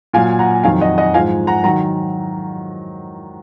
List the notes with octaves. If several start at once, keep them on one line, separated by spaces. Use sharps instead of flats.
A#2 F#3 F5 G#5
F#5 A#5
F2 D#3 F#3 F5 G#5
D#5 F#5
D#5 F#5
G#2 F3 F5 G#5
F#5 A#5
D#3 F#3 F#5 A#5